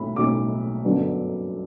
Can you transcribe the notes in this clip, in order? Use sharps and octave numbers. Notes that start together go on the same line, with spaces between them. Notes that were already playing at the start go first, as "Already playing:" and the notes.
Already playing: B1 A2 F#3 C4 B5
B1 A2 F#3 C4 D6
G1 F#2 D3 F#3 B3